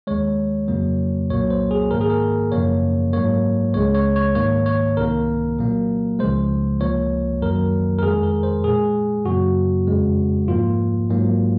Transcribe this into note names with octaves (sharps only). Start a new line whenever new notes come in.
D#2 D#3 G#3 C#5
F2 C#3 F#3 A#3
C2 A#2 F#3 A#3 C#5
C5
G#4
G#2 D#3 A#3 A#4
G#4
A#4
F#2 C#3 F3 A#3 C#5
G#2 F#3 A#3 C#5
C#2 C#3 G#3 C#5
C#5
C#5
G#2 D#3 A#3 C#5
C#5
C2 C3 D#3 A#3 A#4
A#2 F#3 A#3
C#2 C#3 F3 G#3 C5
C#2 C3 F3 A#3 C#5
F#2 D#3 F#3 A#3 A#4
A#4
F2 D#3 G#3 G#4
A#4
C5
A#2 G#3 G#4
F#2 C#3 F#3 A#3 F#4
F2 C#3 G#3
G#2 F3 A#3 F4
G#2 F#3 A#3